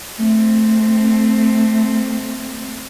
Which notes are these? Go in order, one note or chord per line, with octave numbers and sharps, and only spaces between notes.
A3 C4